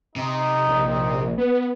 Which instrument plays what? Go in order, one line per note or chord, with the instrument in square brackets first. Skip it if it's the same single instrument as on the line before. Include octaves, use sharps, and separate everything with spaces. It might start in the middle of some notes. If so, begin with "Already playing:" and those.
[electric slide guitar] C3 [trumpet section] D#4
[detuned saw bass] A#1
B3